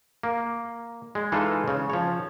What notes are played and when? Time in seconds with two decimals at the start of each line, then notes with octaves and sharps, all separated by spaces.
0.23 A#3
1.15 G#3
1.32 E3 G#3 D#4 F4 A4
1.68 C#3
1.90 F3 C#5